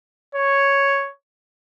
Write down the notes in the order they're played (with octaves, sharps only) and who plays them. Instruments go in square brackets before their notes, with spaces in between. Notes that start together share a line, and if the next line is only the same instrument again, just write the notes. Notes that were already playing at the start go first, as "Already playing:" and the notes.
[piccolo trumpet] C#5